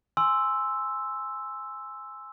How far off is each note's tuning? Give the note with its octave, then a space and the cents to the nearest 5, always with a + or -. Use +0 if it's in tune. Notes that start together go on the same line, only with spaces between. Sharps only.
G#5 +0 C6 +0 E6 +0